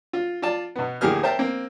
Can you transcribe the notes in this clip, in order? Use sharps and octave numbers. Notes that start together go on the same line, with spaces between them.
F4
F4 D5 A5
B2 B3
D2 A2 A#3 G4 G#4 F6
A#4 C5 E5 G5 A5
A#3 C4